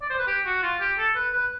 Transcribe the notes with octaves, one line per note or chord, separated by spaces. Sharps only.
D5
C5
B4
G4
F#4
F4
G4
A4
B4
B4